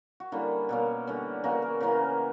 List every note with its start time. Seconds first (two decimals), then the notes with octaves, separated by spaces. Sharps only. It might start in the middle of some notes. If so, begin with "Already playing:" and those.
0.20 F#4
0.32 D3 G3 A#3 C#4 E4
0.69 B2 A#3 C#4
1.07 D3 G3 C#4
1.44 C#3 E3 A#3 F#4
1.62 A#4
1.81 C#3 E3 A#3 C#4